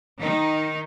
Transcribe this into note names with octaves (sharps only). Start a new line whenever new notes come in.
D#3 D#4